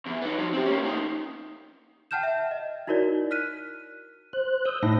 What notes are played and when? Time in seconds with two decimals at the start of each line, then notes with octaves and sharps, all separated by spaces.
0.06 E2 E3
0.22 B3 D#4
0.39 F3 F#3
0.53 C4 G4
0.66 A#3 C#4
0.84 F3 D#4
2.11 F#5 G5 A5 F6 G6 E7
2.23 E5
2.51 D#5
2.87 D#4 E4 F#4 A#4 C#5 D5
3.31 F6 F#6 B6 D#7
4.33 C5 F#6
4.65 D#6 E6 G6
4.83 A2 D#4 A#6